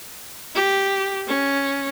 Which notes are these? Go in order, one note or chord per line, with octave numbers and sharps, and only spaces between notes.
G4
C#4